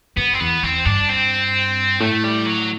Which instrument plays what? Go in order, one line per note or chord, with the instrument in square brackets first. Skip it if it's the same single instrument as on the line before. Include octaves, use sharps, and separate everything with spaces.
[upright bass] F#2 [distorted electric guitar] B3
[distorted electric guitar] C4
[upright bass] E2 [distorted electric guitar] B3
[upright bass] E2 [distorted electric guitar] C4
[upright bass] G2 [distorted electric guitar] D4
[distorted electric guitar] C4
[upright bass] A2 [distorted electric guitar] A3
[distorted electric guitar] G3
F#3